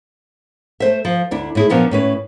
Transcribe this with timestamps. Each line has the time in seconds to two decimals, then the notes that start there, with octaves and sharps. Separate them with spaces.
0.80 A3 C5 E5
1.05 F3
1.31 D2 D4 E4
1.55 A2 E4 G#4
1.70 A#2 F3 F#3 B3 D4
1.91 A2 C#4 B4